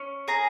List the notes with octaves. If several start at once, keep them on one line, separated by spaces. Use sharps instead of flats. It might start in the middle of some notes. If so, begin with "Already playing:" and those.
Already playing: C#4
G#4 G#5 A#5